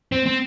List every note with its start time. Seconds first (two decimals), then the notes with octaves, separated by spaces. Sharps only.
0.12 C4
0.26 C4